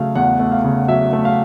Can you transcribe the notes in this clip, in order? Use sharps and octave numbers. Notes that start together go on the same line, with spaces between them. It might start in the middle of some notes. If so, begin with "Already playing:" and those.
Already playing: C#3 F#3 A3 F5
E2 F#5
A3
F5
C#3
F#3 E5
A3
F5